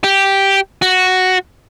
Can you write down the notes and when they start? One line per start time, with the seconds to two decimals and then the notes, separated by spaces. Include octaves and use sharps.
0.04 G4
0.82 F#4